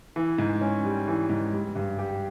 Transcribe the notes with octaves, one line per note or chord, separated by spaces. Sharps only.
E3
G#2
C#4
G3
E3
G#2
G3
G2
G4